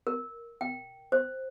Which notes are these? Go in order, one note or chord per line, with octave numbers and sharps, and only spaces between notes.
A#4
G5
C5